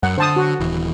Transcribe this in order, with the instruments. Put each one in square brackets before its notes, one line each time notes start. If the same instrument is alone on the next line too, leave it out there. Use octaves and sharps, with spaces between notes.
[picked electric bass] F#2 [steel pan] F#5
[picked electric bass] D3 [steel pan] C5 A5 D#6
[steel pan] F#4
[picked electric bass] D#1 E3